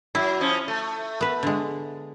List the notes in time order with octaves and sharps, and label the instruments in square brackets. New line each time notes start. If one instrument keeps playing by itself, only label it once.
[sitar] F#3 [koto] E4
[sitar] F3 C#4
A3
[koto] B3 B4
D3 G#3